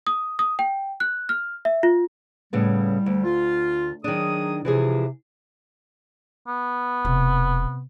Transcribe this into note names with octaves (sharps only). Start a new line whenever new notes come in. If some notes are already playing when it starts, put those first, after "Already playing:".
D#6
D#6
G5
F#6
F6
E5
F4
A2 C#3 G3 B3
D2
F4
D#3 F#3 D4 G#4 D#6
C3 E3 F3 G#4
B3
E1 C3